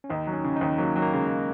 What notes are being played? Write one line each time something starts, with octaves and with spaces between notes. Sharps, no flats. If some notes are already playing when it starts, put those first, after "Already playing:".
C#4
D#2 D#4
F#3
C#4
C#3
D#4
D#2
F#3 A#3
F#3
A#3
C#3 G#3